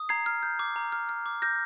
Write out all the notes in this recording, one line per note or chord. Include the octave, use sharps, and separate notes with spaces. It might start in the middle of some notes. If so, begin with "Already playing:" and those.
Already playing: D#6
A#5 G#6 C7
F6
G6
D6
A#5
F6
F6
D6
F6 G6 A#6